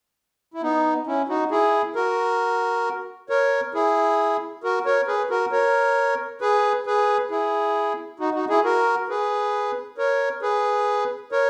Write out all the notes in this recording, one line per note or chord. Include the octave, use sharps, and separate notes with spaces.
E4
B3 D#4
C#4 E4
D#4 F#4
E4 G#4
F#4 A#4
A#4 C#5
E4 G#4
F#4 A#4
A#4 C#5
G#4 B4
F#4 A#4
A#4 C#5
G#4 B4
G#4 B4
E4 G#4
D#4 F#4
D#4 F#4
E4 G#4
F#4 A#4
G#4 B4
A#4 C#5
G#4 B4
A#4 C#5